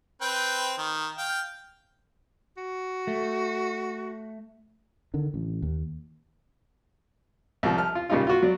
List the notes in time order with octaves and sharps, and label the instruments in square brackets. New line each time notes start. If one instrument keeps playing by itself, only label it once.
[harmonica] C4 B4 G5
D#3
F5 G5
[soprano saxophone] F#4
[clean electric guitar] A3
[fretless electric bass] D3 D#3
A1
D#2
[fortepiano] C2 F3
F6
F4
A#2 C#3 G3 D#4 F4
F4 F#4
F#3 D5